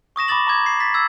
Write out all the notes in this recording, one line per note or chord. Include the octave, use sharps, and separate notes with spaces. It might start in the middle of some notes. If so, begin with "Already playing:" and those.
C#6 D#6 A#6 E7
B5 D6 D#6 A6 F#7
A#5 D6 G#6
C7
A6 B6
E6 G#6